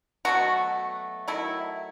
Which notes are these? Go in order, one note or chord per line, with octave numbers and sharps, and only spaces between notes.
B2 F#3 A3 F#4
D#3 F#3 A3 E4